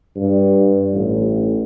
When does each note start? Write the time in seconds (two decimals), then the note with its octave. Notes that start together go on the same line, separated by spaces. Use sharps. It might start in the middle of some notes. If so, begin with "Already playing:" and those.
0.16 G2
0.93 A1